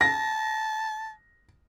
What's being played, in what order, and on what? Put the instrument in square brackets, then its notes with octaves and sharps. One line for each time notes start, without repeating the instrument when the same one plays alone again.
[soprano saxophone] A5 [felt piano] A#6